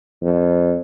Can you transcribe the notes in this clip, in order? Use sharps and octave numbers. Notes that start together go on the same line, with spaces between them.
F2